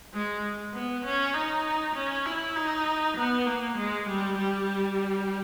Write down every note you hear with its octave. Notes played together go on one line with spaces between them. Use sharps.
G#3
B3
C#4
D#4
C#4
E4
D#4
B3
A#3
G#3
G3
G3